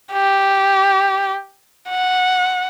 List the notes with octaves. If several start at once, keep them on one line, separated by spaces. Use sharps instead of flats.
G4
F#5